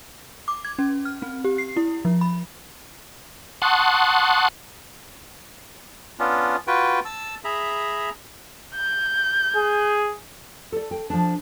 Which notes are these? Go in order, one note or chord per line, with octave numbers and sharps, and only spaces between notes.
D6
G#6
C#4
F6
C4
G4
C7
E4
F3
B5
F#5 A5 C6 C#6 D#6 F#6
B3 C#4 D4 F4
F4 F#4 B4 G5
A5 E6
G#4 E5 A#5 B5
G6
G#4
A4 D5
G5
F3 D4